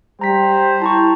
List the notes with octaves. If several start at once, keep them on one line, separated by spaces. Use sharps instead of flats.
G3 C5 G5 A#5 B6
E4 A5 A#5 C#6